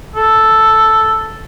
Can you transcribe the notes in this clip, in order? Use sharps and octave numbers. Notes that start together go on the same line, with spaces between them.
A4